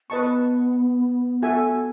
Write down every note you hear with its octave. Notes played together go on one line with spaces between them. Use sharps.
B3 B4 D#5 A5 C#6
F#4 A4 E5 G#5